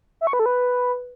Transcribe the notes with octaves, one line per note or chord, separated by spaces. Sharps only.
E5
C#6
B4
A4
B4